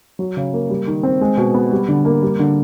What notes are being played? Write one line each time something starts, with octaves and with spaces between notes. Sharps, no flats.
F#3
C#3
A#3
G3
D#3
C4
G#3
B2
B3
G3
D3
A#3
G3
D3